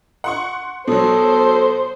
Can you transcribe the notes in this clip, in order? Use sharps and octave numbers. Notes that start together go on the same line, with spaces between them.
F#5 C6 C#6
B2 F#3 A4 C5